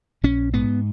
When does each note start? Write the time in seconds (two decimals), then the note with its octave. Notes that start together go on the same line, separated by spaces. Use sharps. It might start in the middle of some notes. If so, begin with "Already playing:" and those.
0.24 A#1 C#4
0.54 G#2 B3